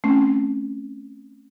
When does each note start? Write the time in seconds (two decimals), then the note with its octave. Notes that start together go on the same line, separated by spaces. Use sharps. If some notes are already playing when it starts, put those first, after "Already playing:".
0.04 A3 C4 C#4